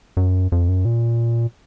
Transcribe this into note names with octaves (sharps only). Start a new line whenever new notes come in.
F#2
F2
F#2
A#2